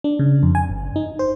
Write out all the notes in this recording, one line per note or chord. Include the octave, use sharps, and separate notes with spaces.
D4
C#3
F2
G#5
G1
D#4
C5